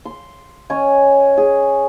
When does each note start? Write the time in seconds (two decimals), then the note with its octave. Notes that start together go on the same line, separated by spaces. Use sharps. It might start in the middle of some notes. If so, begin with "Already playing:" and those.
0.05 C6
0.70 C#4 C#5 D#5 G#5
1.37 G#4